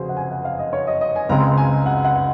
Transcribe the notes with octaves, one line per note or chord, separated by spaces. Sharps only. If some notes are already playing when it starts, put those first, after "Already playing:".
Already playing: F1 F2 C#3 F#4 G#4 C5
F#5
G#5
F#5
F5
D#5
C#5
D#5
D#5
G#5
C#2 C#3 G#3 C4 A#5
G#5
F#5
F#5